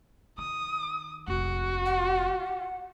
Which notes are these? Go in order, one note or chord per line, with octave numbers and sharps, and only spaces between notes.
D#3 D#6
F1 A#1 F#4
F#5